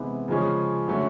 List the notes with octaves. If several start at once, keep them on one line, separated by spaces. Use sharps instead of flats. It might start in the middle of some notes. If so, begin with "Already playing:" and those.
Already playing: C3 E3 G#3 B3
C#3 F3 G#3 C#4
D3 F#3 A3 C#4